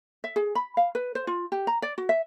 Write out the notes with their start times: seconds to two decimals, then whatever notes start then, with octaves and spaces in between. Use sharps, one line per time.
0.24 E5
0.36 G#4
0.55 B5
0.77 F5
0.95 B4
1.15 C5
1.27 F4
1.52 G4
1.67 A#5
1.82 D5
1.98 F#4
2.09 E5